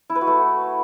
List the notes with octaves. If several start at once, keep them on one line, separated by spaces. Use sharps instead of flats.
E4
B4
F#4
A3